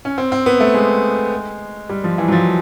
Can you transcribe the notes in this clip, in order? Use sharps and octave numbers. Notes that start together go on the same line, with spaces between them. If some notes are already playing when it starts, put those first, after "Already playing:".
C#4
C4
C4
B3
A3
G#3
G3
F3
E3
F#3
F3